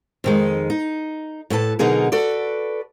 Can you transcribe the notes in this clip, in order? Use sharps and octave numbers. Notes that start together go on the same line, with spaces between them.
F2 D#3 G#3
D#4
A2 A4 B4 A5
B2 D3 F#3 D#4 G#4 A#4
F#4 A4 B4 D5